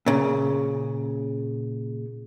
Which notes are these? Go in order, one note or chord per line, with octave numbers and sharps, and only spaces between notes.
A#2 C#3